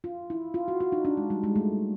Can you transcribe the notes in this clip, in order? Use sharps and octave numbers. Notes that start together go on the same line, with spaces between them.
F4
E4
F4
F#4
F#4
D#4
D4
G#3
G3
G#3
A3